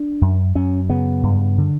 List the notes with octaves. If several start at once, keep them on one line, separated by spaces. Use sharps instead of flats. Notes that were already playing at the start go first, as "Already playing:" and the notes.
Already playing: D4
F#2
F#2 C#4
C#3 B3
G2
D3